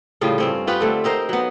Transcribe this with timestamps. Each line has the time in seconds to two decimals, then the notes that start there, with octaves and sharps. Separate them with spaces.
0.21 A2 C#3 G3 F4
0.38 G2 C4 C#4
0.67 B3 F4 G4 B4
0.81 D3 A3 C4
1.04 C4 D#4 A#4 C5
1.29 F#3 B3